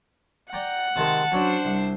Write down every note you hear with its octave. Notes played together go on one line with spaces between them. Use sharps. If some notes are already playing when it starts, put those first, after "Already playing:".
D5 F#5 G5 A#5
C3 D#3 G#3 A5
F#3 C#4 D4 C5 D5
C2